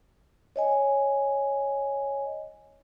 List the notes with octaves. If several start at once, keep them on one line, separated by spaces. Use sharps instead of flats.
C#5 D#5 G#5